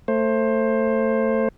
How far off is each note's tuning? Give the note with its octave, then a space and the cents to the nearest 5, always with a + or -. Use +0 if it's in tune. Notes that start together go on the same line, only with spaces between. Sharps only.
A3 +20 C5 +20